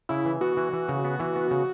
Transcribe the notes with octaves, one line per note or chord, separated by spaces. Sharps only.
C#3 E4
E3
B3 F#4
E3
E3
C#3
B3
E3
B3
C#3